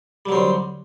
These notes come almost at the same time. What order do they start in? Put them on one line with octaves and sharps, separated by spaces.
G3 F#3 C4 D3